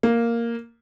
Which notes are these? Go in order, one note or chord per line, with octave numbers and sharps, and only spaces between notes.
A#3